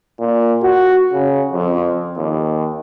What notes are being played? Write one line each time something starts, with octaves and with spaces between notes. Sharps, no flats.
A#2
F#4
C#3
F2
D#2